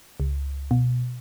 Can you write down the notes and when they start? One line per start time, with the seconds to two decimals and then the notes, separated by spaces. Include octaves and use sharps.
0.20 C#2
0.71 B2